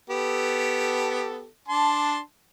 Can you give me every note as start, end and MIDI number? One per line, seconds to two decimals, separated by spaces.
0.10 1.46 59
0.10 1.46 67
0.10 1.46 69
1.68 2.19 62
1.68 2.19 81
1.68 2.19 84